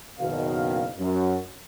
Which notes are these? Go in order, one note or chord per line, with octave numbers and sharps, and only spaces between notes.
F#1 B2 D#3 F5
F#2